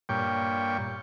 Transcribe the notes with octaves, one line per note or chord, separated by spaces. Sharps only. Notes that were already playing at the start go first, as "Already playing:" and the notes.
G2 A#2 C#5 G5